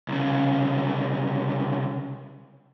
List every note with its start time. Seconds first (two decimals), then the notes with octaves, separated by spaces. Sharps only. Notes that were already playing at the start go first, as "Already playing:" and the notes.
0.08 C2 C#3